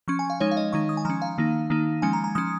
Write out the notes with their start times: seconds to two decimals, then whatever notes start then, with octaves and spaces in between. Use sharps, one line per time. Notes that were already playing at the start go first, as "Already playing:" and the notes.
0.08 F3 C#4 C#6
0.19 G#5
0.30 F5
0.40 F3 G#3 D#4 C#5
0.51 F5
0.57 D#5
0.73 D#3 G#3 D#4 C#6
0.89 D#6
0.97 G#5
1.05 F3 C#4 A#5
1.22 F5
1.38 D#3 A#3 D#4
1.70 D#3 A#3 D#4
2.02 F3 G#3 C#4 G#5
2.13 A#5
2.24 A#5
2.35 F3 C#4 D#6